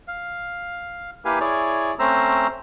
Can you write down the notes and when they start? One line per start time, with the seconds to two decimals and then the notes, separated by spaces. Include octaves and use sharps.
0.08 F5
1.25 A#3 E4 G4 B4 F5 G#5
1.40 E4 G#4 C#5 D5
1.99 A3 C4 C#4 C5 A#5 E6